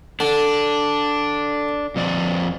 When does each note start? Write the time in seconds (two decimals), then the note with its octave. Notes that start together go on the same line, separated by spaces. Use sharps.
0.20 D3 D4
1.96 F2 F3 D5